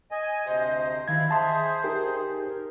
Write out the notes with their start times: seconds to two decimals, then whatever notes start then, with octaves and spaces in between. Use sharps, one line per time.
0.11 D#5 G#5
0.46 D2 C3 C5 D#5
1.08 D#3 E4 F5 G#6
1.31 G#4 C5 E5 A5 C6
1.84 D#4 G4 A#4
2.48 A#4